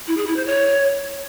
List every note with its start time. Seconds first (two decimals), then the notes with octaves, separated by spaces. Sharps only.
0.07 E4
0.17 G#4
0.27 E4
0.36 C5
0.46 C#5